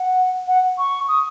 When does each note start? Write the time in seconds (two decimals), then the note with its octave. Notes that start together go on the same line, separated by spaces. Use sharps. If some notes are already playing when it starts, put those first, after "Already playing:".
Already playing: F#5
0.47 F#5
0.78 C#6
1.08 D#6